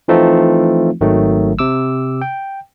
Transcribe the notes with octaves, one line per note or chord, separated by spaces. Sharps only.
E3 F3 A3 C4 D#4 F4
G#1 D#3 F#3 A3
C3 D6 E6
G5